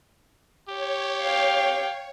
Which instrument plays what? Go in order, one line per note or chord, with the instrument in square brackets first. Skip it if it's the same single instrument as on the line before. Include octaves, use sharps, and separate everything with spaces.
[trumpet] G4 [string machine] C#5
[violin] F5 G5